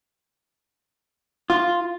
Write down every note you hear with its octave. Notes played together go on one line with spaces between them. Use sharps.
F4